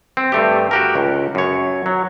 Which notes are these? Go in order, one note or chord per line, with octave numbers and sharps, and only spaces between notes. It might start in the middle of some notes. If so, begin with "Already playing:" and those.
C4
G2 A3 G4
F#4 G4 A#4
C#2
F#2 C#5
F#3